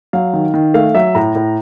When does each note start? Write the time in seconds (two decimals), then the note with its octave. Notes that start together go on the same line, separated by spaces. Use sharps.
0.13 F#3 F5
0.33 D#3
0.54 D#3
0.74 A3 F5
0.95 F#3 E5
1.15 A2 A#5
1.35 A2